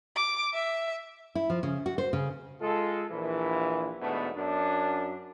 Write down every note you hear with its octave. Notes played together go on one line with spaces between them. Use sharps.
D6
E5
E4
F3
C#3
F#4
C5
C#3
G#3 F4 A4
A#1 E3
E2 G#2 B2 A3 B3 D4
F#2 D4